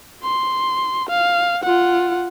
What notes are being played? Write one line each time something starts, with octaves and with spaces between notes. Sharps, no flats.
C6
F5
F4 F#5